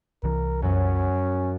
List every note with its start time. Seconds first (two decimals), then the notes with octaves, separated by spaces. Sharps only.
0.24 C2 E3 A#4
0.62 F#2 F#3 C#4